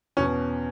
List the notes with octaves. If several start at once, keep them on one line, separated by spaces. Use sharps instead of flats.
E2 B2 C#4